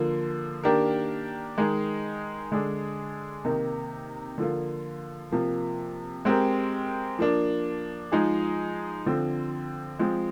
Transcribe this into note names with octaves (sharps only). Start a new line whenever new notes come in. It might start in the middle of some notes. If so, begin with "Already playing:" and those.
Already playing: D3 F3 A#3
D#3 A#3 D4 G4 A#4
D#3 G#3 D#4 G#4
D3 G#3 D4 G#4
C3 D#3 A#3 D#4
D3 F3 A#3 F4
C3 F3 A#3
G#3 C4 G4 A#4
F3 A#3 D4
F3 G#3 D#4 G#4
D3 F3 C4
F3 G#3 C4